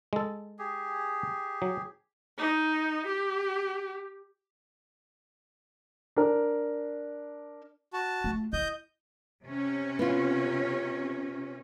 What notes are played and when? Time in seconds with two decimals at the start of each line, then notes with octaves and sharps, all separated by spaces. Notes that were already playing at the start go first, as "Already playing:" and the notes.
0.13 G#3 A4
0.59 G4 G#4
1.62 F#3
2.38 D#4
3.07 G4
6.16 D4 A#4
7.93 F#4 A5
8.24 A3 F4
8.53 E4 D#5 G6
9.44 C3 C#4
9.99 B3 F4